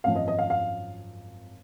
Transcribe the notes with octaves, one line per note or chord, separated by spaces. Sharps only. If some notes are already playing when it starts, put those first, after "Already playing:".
G#1 F#2 F3 F5
D#5
D#5
F5
F5